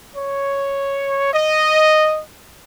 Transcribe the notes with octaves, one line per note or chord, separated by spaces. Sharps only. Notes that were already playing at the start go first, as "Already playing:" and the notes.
C#5
D#5